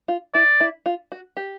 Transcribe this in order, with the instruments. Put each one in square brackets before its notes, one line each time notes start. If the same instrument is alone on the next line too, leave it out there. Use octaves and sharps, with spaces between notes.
[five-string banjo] F4
[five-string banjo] E4 [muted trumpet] D5
[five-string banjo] E4
F4
F#4
G4